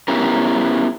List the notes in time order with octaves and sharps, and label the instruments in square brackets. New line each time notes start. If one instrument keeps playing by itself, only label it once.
[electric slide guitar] B3 C#4 E4 G4 A#4